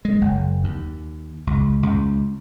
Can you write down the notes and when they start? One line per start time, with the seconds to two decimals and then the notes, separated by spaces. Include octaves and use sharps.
0.05 G#3
0.21 F#1
0.64 D#2
1.47 C#2
1.83 C#2